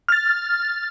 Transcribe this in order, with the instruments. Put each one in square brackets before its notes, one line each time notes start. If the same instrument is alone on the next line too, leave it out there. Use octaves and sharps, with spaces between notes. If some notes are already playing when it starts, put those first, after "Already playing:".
[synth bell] F6 A6